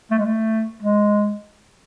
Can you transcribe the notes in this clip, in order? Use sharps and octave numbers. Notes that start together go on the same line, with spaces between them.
A3
G#3
A3
G#3